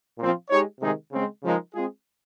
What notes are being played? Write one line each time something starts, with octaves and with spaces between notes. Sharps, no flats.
A#2 F3 C4 F4
G#3 D#4 G4 C#5
C3 D#3 G#3 D#4 G#4
C#3 G#3 C4
C#3 F3 G#3 D#4 A#4
G#3 C4 F4 G#4